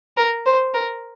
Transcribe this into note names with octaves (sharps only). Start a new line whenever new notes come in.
A#4
C5
A#4